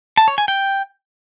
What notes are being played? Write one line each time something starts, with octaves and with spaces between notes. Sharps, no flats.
A5
C#5
G#5
G5